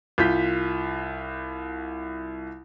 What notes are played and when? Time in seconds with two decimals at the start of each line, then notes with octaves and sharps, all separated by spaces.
0.18 C2 F4 G6 B6